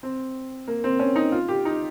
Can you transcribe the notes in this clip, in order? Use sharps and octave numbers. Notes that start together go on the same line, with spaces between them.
C4
A#3
C4
C#4
D#4
F4
G4
D#4